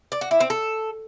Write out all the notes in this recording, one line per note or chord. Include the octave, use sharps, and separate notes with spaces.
D5
F#4
E4
C4
A4